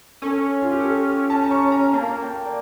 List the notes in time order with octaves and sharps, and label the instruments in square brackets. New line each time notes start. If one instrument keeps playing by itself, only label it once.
[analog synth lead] C#4 [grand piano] A4
[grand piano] F4
G4
A4
A5
A#5
C#6
A#5
[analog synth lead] A#3 [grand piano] A5
[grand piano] G5
D5